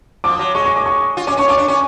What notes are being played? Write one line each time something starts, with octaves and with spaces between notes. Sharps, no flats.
F3 D6
F#3
G#3 C#6
C#6
D6
C#6
F4
C#4 D6
C#4 C#6
F4 D6
D4
C#4 C#6